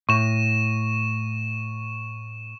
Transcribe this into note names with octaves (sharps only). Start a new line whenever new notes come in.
A2 C#6 E7